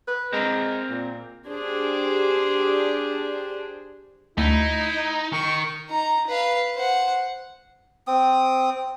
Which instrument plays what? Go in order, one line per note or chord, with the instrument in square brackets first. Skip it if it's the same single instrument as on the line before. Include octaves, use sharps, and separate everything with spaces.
[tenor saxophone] B4
[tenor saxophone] G#3 [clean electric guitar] C4 A#4
[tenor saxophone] A#2
[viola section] D4 G4 G#4 C5
[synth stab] D2 A3 C#7 [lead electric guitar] D#4 [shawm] E4
[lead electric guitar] D#3 [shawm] C#6
[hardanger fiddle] D#4 A#5
B4 F5
C5 F#5
[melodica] C4 D#6